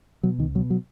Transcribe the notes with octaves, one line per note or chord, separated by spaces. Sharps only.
B2 F#3
C#2 D#3
B2 F#3
F#3